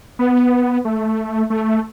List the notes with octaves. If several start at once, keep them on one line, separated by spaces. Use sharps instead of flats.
B3
A3
A3